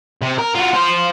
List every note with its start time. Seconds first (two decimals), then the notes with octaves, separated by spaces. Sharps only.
0.22 C3
0.38 A#4
0.54 F4 F#4
0.74 F4 C5